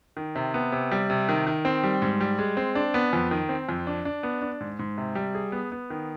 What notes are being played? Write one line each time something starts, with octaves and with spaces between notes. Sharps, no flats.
D#3
C3
B3
C3
G3
C3
D#3
D#3
C4
G3
G#2
G3
G#3
C4
D4
B3
F2
D#3
C4
F2
D4
D4
B3
D4
G#2
G#2
C3
G3
G#4
B3
B3
D#3